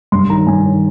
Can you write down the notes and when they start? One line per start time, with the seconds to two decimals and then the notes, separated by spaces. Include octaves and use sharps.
0.12 G2 C6
0.30 D#3 A#5
0.47 G2 G#5
0.65 D#3